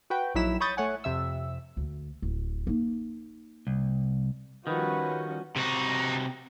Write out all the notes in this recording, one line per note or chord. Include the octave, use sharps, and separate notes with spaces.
F#4 B4 G5
A#1 F#3 D#4 E4 B6 E7
C#5 B5 C#6 D#6 G6 A6
A3 C#5 F#5 G#5
F2 C3 E5 E6
D2
D1
A#3 D#4
C2
D#3 F3 G3 C#4 F#4 B4
C#2 C3 D#4 F#4